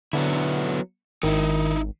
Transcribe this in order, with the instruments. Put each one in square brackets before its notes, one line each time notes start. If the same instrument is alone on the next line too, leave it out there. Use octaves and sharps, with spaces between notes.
[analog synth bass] D3 [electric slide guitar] F#3 B3 E4
[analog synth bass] G#1 [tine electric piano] D#3 [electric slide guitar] D#4 E4